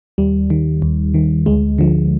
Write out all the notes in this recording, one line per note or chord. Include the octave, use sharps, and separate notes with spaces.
D#2 G3
D#3
D#2
D#3
D2 G#3
D3 F3